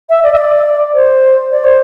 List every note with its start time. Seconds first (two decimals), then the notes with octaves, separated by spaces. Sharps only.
0.09 E5
0.23 D5
0.33 E5
0.37 D5
0.94 C5
1.51 D5
1.64 C5